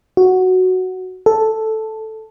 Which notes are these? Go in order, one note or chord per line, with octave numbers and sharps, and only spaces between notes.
F#4
A4